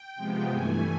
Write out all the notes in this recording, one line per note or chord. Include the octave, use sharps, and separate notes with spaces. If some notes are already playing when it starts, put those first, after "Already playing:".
Already playing: G5
C3 F3 G#3 B3
G2 E3 A3 G#5